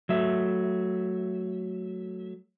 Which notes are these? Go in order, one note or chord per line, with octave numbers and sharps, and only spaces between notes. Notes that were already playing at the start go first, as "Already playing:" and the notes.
F#3 A3 E5